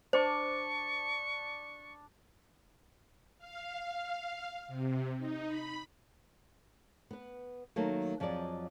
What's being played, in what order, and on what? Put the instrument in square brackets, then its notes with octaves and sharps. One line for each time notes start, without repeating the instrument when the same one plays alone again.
[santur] D4 A5 D6 [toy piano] C5 [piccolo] C#6
[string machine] F5
C3
D#4
B5
[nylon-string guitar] B3 B4
D#3 F#3 A3 A#3
F2 F3 F#3 G#4 D5 D#5